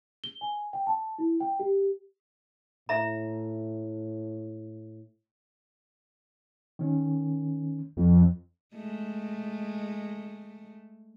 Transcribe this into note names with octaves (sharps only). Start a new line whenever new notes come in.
G7
G#5
G5
A5
E4
G5
G4
A2 E5 A#5
D#3 C#4
F2
G#3 A3